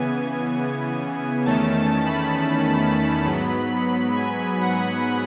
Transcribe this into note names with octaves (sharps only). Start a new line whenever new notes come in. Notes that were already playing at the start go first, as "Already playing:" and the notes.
Already playing: C#3 E3 B3 G#5
E2 D#3 A3 C#4 A5
A5
B5
G#2 F#3 B3
G#5
F#5